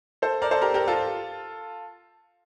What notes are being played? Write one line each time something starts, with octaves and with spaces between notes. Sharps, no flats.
A4 C5
A#4 D5
A4 C5
G4 A#4
G4 A#4
F4 A4